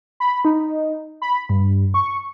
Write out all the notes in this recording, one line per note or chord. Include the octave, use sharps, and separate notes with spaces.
B5
D#4
B5
G2
C#6